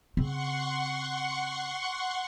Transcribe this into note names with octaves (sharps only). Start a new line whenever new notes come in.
C#3 C4 F#5 C6 C#6